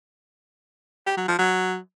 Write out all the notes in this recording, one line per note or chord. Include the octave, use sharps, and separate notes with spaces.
G4
F#3
F3
F#3